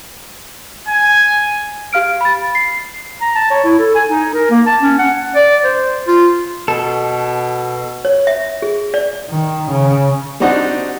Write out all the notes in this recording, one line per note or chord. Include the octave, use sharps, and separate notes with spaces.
G#5
G4 F5 F6 D7
B5 A6
C7
A#5
A5
C#5
E4
A4
G#5
D#4
A#4
A#3
A5
C#4
F#5
D5
C5
F4
B2 A4
C#5
E5
G#4
D5
D#3
C#3
G3 C4 D4 D#4 F#4 F#5